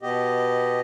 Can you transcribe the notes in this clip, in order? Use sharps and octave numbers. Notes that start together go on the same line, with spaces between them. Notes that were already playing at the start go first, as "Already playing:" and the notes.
B2 B3 G4 D#5